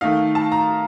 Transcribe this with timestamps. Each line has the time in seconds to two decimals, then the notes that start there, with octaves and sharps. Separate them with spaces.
0.01 D#3 A3 D#4 F5
0.35 A5
0.52 A#5